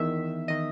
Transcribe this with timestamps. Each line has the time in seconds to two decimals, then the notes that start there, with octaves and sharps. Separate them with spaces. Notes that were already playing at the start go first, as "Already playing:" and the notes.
Already playing: E2 D#3 E5
0.48 D#3 D#5